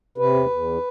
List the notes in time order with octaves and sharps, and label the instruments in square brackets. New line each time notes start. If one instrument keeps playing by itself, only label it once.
[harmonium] C3 B4
E2
E2